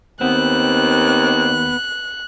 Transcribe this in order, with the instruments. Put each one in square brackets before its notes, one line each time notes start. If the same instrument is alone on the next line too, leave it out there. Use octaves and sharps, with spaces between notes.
[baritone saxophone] D#2 [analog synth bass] B3 [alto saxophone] C4 [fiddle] F#6